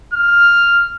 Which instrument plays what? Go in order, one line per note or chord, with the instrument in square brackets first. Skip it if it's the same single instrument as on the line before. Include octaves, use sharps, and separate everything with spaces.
[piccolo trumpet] F6